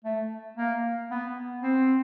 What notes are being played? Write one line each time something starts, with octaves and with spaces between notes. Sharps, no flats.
A3
A#3
B3
C4